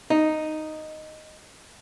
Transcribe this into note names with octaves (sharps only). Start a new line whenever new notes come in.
D#4